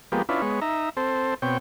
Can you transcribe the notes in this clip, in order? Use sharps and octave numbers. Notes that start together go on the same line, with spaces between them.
F3 G#3 A#3 B3 G4
C#4 D4 E4 F4 B4
G#3 B3 C#5
D#4 E5 A#5
C4 A4 C5
B2 C4 C#5 G5